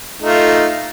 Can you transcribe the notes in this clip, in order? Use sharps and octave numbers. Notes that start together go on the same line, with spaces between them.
A3 D#4 F4